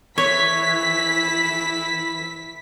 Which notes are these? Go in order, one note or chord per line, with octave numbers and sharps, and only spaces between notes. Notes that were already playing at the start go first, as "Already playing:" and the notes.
E3 E4 C#5 B6